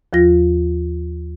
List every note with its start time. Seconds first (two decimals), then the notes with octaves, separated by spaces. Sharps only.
0.13 D#2 F3 F4 A#6